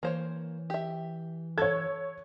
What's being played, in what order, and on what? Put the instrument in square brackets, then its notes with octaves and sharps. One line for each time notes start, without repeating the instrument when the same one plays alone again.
[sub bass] E3 [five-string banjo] A#3 C5 C#5
[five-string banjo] G4 E5
[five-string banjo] A4 [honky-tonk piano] C#5 G#6